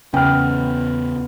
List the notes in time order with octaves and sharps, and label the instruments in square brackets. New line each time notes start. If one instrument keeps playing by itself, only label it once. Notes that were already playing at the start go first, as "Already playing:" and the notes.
[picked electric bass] E2 C#4 [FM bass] C#3 [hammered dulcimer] B3 [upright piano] G5 F6